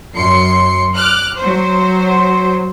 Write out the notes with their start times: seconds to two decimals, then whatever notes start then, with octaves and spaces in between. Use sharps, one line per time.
0.16 F#2 C6 C7 C#7
0.95 D6 F6 F#6
1.37 F#3 C5